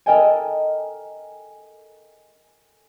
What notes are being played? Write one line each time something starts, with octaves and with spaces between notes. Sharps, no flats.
A4 A#4 D#5 G5 G#5